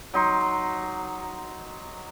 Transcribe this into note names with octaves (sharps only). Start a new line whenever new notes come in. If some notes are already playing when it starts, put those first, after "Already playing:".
F#3 D#4 C6